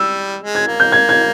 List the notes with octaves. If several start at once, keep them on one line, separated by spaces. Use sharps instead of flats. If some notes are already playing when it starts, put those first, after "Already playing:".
Already playing: G3 E6
G#3
G#6
A#3
G6
G#6
G#6